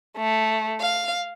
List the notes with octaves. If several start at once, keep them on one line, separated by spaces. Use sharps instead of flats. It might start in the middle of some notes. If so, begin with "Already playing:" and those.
A3
F5